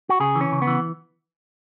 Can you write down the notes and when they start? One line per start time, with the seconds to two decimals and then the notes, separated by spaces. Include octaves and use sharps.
0.09 F#4
0.20 C#3 G#4
0.35 E3
0.41 C#4
0.52 C#3
0.62 B3
0.67 E3